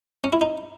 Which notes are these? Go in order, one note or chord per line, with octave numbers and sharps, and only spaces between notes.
C#4
E4
D#4